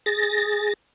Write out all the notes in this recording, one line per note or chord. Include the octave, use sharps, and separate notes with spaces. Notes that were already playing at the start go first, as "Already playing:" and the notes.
G#4 A6 A#6